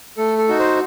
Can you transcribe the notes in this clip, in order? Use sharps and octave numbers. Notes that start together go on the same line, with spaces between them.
A3 A4
A4
D#4 F#4
C5